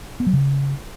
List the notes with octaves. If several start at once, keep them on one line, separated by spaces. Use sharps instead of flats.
B3
F#3
C#3